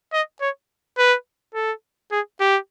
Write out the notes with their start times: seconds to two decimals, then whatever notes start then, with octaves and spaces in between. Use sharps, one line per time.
0.13 D#5
0.41 C#5
0.98 B4
1.55 A4
2.12 G#4
2.40 G4